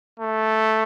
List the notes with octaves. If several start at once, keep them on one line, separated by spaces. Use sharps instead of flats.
A3